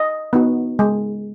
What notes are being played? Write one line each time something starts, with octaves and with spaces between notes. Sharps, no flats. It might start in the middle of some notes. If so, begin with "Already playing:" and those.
Already playing: D#5
B3 D#4 F#4
G#3